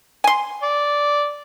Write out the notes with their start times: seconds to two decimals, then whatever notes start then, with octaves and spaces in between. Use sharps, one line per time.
0.24 G#5 C6
0.62 D5